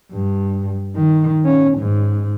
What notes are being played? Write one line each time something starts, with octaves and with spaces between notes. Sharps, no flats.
G2
D#3
C#4
G#2